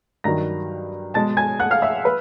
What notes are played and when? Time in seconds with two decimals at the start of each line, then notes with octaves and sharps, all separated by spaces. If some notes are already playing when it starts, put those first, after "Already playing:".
0.24 G2 D#3 F#3 A#5 A#6
1.14 B2 G#3 A5 A6
1.37 G#5 G#6
1.60 F#5 F#6
1.71 F5 F6
1.82 E5 E6
2.05 B4 B5